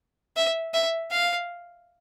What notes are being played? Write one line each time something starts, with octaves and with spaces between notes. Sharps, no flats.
E5
E5
F5